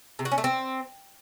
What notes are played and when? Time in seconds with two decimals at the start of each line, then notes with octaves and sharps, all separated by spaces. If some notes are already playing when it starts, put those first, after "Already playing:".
0.19 C3
0.25 F#4
0.32 C#4
0.38 A3
0.44 C4